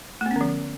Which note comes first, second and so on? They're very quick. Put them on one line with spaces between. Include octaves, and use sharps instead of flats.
A3 B3 C#4 D3 F3